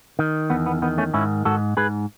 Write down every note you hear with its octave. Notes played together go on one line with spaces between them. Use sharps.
D#3
E2 B3
B3
D#3 B3
A3 C#4
G#2 C#4 E4
G#2 F#4 A4
G#2 G#4 B4